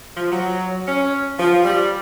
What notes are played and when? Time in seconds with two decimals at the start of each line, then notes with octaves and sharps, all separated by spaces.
0.15 F3
0.30 F#3
0.87 C#4
1.39 F3
1.63 G3